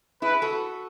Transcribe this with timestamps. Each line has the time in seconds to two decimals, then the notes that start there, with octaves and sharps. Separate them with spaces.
0.22 E4 G#4 B4
0.42 F#4 A4